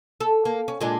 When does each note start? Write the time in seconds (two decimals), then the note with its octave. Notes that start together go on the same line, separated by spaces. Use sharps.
0.20 A4
0.45 A#3
0.68 C#4
0.81 A#2 G#3 D4